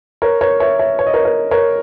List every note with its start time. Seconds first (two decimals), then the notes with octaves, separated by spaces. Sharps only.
0.22 A#4 C#5
0.41 A#4 C#5
0.60 C#5 E5
0.79 C#5 E5
0.99 C#5
1.06 D#5
1.14 A#4 C#5
1.25 A#4 C#5
1.51 A#4 C#5